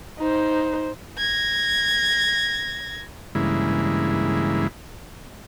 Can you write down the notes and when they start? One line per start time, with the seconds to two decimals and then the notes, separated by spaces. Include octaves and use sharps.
0.19 D#4 C5
1.18 G#6 A#6
3.35 G2 C#3 E3 G#3 A#3 E4